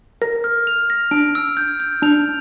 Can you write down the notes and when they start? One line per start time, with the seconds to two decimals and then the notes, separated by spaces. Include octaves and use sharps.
0.22 A#4 A#6
0.44 F6
0.67 F7
0.90 A#6
1.11 D4 D7
1.35 E6
1.57 G6
1.80 G6
2.02 D4 F7